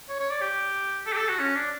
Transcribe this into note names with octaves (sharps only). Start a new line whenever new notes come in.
C#5
C#5
D5
G4
A4
G4
A4
F#4
C#4
D4